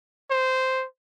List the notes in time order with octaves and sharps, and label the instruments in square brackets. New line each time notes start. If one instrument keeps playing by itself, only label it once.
[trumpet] C5